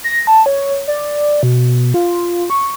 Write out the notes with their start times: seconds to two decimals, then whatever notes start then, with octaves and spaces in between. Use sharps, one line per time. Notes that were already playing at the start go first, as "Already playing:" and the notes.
0.04 A#6
0.27 A5
0.46 C#5
0.88 D5
1.43 B2
1.94 F4
2.50 C#6